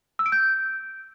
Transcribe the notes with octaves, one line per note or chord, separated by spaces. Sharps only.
E6
D7
G6